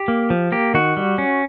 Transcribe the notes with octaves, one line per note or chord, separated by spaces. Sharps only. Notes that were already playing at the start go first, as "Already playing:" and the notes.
Already playing: G4
A#3
F3
A#3 G4
D#3 F#4
G3
C#4